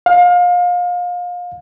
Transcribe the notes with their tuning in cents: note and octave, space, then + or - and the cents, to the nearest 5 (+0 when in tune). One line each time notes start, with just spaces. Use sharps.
F5 +30